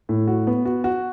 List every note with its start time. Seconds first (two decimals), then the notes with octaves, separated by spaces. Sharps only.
0.09 A2
0.28 F#4
0.47 B3
0.65 F#4
0.84 F#4